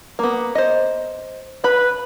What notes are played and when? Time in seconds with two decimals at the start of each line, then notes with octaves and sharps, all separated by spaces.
0.19 A#3 B3
0.55 C5 D#5
1.64 B4 B5